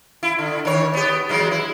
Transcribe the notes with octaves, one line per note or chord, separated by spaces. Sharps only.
E4
D3
D#3 C#5
B3 G4
E3 F#3 G#3
E4